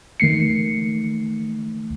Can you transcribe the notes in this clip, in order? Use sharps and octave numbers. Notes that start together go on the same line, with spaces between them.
D#3 A3 C7 C#7